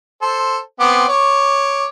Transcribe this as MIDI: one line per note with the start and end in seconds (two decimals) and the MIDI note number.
0.22 0.58 69
0.22 0.58 72
0.80 1.05 59
0.80 1.05 60
0.80 1.05 86
1.09 1.86 73
1.09 1.86 86